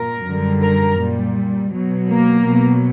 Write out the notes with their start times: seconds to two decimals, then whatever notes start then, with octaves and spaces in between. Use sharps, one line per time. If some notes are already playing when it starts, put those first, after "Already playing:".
Already playing: A#2 A#4
0.24 F#2 D3 G3
0.61 A#4
0.99 A#2 G3
1.71 B2 F#3
2.08 A#3
2.45 B2 F#3